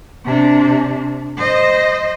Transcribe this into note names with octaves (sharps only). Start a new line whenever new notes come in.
C3 D4
C5 D#5